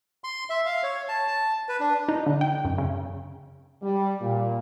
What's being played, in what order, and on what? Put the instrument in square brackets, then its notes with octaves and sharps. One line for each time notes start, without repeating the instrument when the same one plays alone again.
[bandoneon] C6
E5
F5
C#5
A5
A5
B4
D4
[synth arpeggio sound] D#4
D3
G5
F#2
C#3
[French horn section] G3
A#2